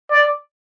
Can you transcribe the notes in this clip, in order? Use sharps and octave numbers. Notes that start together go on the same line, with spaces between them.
D5